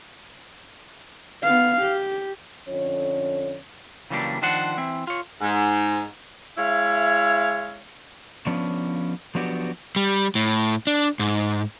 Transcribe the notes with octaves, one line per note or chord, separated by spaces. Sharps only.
B3 F5
G4
F2 D3 C#4 C#5
C#3 E3 F#3 G3 A#3 D4
D#3 F3 D4 C5 F#5
E3 C4 E4
F4 C#5
G#2
G#3 E4 C#5 E5 F5
F3 B3 C#4 D4
F3 F#3 B3 D4 F#4 G4
G3
A2
D4
G#2